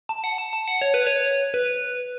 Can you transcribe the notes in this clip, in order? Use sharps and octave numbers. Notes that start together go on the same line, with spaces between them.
A5
F#5
A5
A5
F#5
C#5
B4
C#5
B4